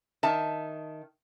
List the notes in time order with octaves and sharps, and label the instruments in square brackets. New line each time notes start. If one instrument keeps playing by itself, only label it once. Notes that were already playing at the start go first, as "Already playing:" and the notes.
[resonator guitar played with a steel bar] D#3 E5 A5